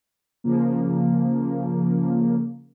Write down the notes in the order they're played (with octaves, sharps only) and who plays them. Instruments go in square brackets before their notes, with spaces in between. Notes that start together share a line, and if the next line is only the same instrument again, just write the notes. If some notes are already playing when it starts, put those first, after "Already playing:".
[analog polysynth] C#3 F3 A#3